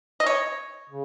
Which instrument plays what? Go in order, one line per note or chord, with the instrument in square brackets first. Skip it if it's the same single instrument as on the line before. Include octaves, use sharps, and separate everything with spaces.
[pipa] D#5
C#5
[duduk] C#3